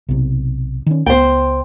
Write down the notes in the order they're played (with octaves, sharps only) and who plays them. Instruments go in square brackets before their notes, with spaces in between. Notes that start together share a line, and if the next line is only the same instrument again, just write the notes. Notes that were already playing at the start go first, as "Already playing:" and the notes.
[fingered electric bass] B1 C3
D#3 C#4
[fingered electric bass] C#2 B3 [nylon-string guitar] C5 G5